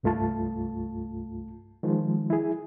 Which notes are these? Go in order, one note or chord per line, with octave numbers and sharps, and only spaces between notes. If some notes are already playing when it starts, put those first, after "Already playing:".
C2 G2 A3 F4 A5
D#3 F3 G#3
E4 G#4